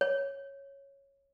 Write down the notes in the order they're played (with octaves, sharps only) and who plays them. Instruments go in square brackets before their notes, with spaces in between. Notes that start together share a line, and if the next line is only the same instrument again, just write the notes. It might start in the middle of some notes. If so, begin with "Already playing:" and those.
[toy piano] C#5